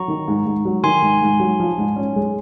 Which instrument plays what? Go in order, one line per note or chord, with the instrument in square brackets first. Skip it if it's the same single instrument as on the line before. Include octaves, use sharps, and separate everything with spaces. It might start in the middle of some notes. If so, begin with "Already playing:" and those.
Already playing: [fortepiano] F#3 [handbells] A#5 C#6
[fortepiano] D#3
G#2
G#2
F#3
[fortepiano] D#3 [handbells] G#5 C6
[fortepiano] G#2
G#2
F#3
F3
G#2
C#4
G#3